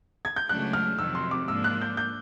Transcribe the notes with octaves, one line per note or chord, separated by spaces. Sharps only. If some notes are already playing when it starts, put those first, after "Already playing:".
G#6
G6
C#2 C#3 F#3 A3 D4 F#6
F6
F2 C3 D#3 F#3 E6
C6
D6
G#2 F3 A#3 D4 E6
F#6
G6
G6